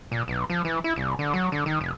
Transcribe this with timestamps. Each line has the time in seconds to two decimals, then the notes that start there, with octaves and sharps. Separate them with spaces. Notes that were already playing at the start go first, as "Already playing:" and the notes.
0.12 A#2
0.28 B1
0.50 F3
0.65 E3
0.84 E4
0.96 C2
1.19 D3
1.34 F#3
1.52 D3
1.66 D#3
1.81 F1